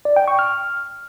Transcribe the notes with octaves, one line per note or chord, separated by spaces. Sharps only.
D5
G5
C#6
F6